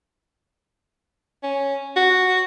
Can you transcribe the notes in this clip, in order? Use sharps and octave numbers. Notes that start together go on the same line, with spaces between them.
C#4
F#4